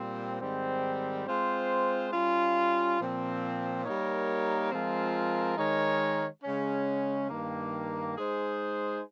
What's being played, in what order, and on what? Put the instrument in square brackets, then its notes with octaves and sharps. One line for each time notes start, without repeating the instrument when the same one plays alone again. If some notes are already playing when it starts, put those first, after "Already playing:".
Already playing: [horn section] A#2 G3 C4
G#2 D#3 G3 C4
G#3 C4 F4 C5
G3 C#4 F4
A#2 F3 C4
G3 A#3 D#4 A#4 C#5
F3 G#3 C4 F4 A#4
D#3 G#3 D#4 A#4 C#5
C#3 G#3 C#4
G2 D#3 A#3
G#3 D#4 G#4 C5